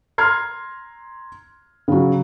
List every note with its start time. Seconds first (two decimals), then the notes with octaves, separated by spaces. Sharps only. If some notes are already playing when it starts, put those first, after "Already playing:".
0.18 A#5 C6 F6 G#6 C7
1.88 C#3 F#3